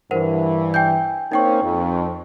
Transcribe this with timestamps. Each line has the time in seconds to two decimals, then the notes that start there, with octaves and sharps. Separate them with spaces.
0.11 G2 E3 A#4 C5 F#5
0.74 G5 G#5 G6
1.32 A#3 C4 C#4 D#4 G5 C#6
1.62 F2